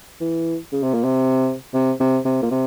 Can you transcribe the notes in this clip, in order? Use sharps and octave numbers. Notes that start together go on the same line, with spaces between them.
E3
C#3
C3
A#2
C3
C3
C3
C3
A#2
C3